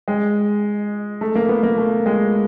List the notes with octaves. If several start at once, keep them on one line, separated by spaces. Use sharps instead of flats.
G#3
A3
A#3
B3
A#3
A3
G#3